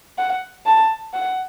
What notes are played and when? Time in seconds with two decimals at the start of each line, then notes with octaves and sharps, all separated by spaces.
0.18 F#5
0.66 A5
1.13 F#5